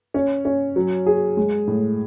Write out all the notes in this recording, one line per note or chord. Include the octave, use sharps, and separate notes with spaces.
C#4
C#4
F#3
G#4
G#3
A2